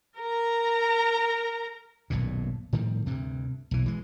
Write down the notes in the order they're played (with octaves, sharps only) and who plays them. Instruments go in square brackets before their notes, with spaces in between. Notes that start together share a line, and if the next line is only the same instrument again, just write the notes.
[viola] A#4 A#5
[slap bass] D#1 B1 G2 A#2
A2 D#3 F3 G3
D2 G2 C3
B1 E3
E3 G#3